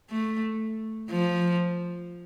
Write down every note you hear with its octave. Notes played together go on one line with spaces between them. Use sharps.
A3
F3